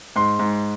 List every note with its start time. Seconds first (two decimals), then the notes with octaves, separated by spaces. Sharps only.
0.16 G#2 C6
0.39 G#2